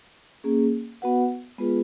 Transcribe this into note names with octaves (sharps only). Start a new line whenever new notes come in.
A#3 C#4 G#4
B3 F#4 B4 F#5
G#3 B3 F4 G#4 B4